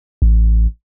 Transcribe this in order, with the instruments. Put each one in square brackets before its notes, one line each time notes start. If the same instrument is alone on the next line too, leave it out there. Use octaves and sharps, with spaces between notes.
[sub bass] A1